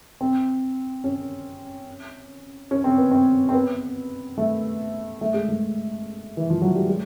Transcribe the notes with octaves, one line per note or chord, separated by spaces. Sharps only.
C4
C#4
C#4
C4
B3
C4
C4
B3
A3
A3
G#3
A3
E3
F3
F#3
G3
G#3